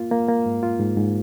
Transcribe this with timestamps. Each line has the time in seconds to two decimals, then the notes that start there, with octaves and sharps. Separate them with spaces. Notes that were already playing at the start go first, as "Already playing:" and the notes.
Already playing: A#3 F4
0.11 A#3
0.28 A#3
0.46 G#2
0.63 F4
0.80 G#2
0.97 G#2